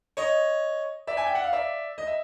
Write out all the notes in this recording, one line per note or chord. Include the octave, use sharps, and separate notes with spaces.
C#5 D#5
D5 E5
G#5
G5
F#5
F5
D5 E5
D#5
E5